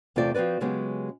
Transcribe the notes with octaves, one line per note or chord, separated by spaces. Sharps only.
E2 C3 A3 C4 F4 D5
F3 C4 F#4 B4 D5
C#3 F#3 G#3 B3 C#4 G4